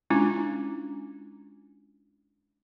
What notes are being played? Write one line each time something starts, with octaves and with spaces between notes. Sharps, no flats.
G#3 C#4 D4 E4 F4